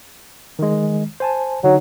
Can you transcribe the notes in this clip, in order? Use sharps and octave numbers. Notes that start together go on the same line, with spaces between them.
D#3 G#3
C5 G#5 A5
D3 F#3 D#4